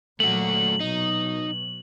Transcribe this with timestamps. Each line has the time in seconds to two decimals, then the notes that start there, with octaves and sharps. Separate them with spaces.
0.20 A#2 F#3 A3 F#4 F#7
0.80 B2 F#3 D#4